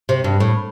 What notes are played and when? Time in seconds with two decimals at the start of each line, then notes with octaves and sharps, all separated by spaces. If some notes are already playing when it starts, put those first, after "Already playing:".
0.09 C3
0.24 G2
0.40 A2